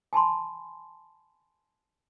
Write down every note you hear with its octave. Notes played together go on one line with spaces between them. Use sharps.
G#5 A5 B5 C6